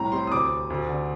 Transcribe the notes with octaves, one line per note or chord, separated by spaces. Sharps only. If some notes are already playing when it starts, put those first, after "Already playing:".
Already playing: C2 A2 A#5
C3 C6
D#6
D2 D6
C3
D2
D3